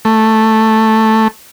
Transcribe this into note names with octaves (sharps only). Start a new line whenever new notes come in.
A3